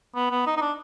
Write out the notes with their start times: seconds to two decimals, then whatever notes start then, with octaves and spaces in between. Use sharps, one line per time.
0.15 B3
0.31 B3
0.46 D#4
0.57 D#4
0.61 D4